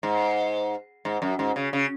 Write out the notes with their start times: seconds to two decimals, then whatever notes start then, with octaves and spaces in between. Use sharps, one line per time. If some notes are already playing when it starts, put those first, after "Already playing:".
0.03 G#2
1.05 G#2
1.22 F#2
1.39 G#2
1.56 C#3
1.73 C#3